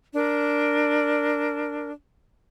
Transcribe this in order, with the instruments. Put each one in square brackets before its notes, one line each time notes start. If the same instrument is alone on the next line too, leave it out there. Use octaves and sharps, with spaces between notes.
[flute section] D4 A#4